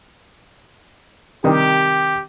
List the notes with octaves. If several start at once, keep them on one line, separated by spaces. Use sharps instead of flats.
C3 D#3 G3 G4